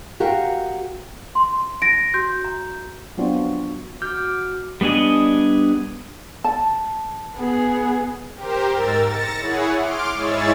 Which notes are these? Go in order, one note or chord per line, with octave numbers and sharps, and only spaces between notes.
F#4 G4 A#4 F5 G5
C6
D#4 A#6 D7
F#4 G6
A#5
F#3 B3 C4 D4 F4 F#4
F#4 D6 F6 G6
G3 B3 D4 G#4 D#5
A5
B3 G#4
G4 A#4 C5
G#2 A#4 E6 A6
A6 A#6 C#7 E7
E4 G#4 C#5 F#5
C6 D6 F6 D7
G#2 E4 G#4 C#5 E6 A6